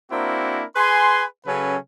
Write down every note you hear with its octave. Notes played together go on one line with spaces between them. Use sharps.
A#3 C4 D4 E4 F#4 A#4
G#4 B4 G#5 C6
C#3 F#3 C#4 A4 B4 G#5